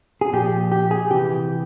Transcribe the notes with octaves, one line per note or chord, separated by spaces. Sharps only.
G#4
A#2 F3 G4
G4
G#4
C3 E3 G4